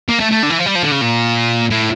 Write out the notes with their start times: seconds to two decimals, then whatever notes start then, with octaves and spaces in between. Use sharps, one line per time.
0.09 A#3
0.20 A3
0.32 A3
0.43 D3
0.50 E3
0.59 F3
0.66 G3
0.75 F3
0.83 D3
0.92 C#3
1.01 A#2
1.71 A2